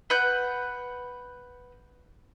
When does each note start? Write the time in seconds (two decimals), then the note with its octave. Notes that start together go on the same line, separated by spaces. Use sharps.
0.10 B4 F#5 G6